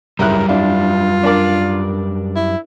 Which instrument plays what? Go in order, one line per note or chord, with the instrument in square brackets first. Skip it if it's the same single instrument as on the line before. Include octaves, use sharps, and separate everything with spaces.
[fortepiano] C#2 E4 F#6 [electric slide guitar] F#2 G3 [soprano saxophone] A#4
[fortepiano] D4 E4 [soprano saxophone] F4
[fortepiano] D4 A#4 D5
[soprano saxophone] E4